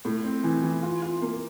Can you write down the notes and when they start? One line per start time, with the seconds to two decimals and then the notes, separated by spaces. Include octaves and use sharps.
0.05 A2
0.24 C4
0.44 E3
0.63 E3
0.83 F4
1.02 F4
1.22 A#3